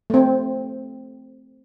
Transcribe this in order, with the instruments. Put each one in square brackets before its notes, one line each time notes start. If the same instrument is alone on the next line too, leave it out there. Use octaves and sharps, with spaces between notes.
[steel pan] A3 C4